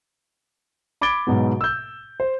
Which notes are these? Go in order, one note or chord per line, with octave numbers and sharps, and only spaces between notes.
B5 D6 G#6 A6 D7 G7
G#2 B2 F#3 B3
E6 G6
C5